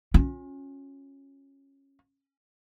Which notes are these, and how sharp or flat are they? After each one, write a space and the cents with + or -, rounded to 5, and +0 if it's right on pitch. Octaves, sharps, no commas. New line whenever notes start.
C#4 -15 F4 +45